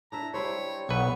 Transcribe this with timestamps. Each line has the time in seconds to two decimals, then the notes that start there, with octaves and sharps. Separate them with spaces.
0.12 D4 E4 E5 A#5
0.34 G3 E4 C5 C#5
0.89 B1 B3 B4 C#6